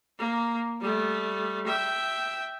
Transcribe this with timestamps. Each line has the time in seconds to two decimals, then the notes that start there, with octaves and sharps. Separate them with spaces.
0.19 A#3
0.81 G3 A3
1.67 E5 G5